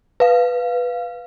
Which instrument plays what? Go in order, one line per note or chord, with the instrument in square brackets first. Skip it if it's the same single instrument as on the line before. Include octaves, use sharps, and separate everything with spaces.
[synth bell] B4 F5